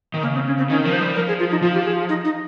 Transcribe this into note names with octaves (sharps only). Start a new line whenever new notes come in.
D#3
C#3 A#3
C4
C#4
C4
D#3 C#4
F3 A#4
C5
G3
F3 A#4
G#4
F4
D#4
F3 F4
G4
G#4
D#4
D#4